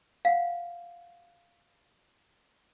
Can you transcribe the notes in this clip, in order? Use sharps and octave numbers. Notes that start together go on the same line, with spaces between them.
F5 F#5